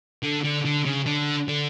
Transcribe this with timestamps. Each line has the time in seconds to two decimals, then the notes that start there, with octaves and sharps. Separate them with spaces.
0.23 D3
0.43 D3
0.65 D3
0.85 C#3
1.06 D3
1.48 D3